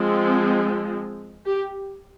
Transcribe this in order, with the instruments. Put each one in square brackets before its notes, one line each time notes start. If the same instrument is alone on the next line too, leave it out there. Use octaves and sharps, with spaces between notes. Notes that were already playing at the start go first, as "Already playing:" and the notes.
Already playing: [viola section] F3 G#3 C4
G4